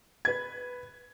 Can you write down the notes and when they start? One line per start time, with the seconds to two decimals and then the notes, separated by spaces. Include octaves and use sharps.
0.25 B4 G#6